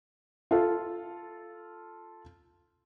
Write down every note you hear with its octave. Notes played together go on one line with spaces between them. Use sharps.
F4 A4 F5